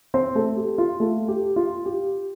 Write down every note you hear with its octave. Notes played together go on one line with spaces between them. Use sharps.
C4 C5
A3 A4
G4
F4
A3 A4
G4
F4
G4